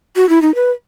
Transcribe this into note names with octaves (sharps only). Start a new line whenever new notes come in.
F#4
E4
D#4
B4